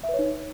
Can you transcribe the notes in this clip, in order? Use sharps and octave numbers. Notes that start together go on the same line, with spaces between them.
E5
B4
C#5
D#4